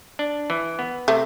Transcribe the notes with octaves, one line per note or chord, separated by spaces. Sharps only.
D4
E3
B3
C3 A3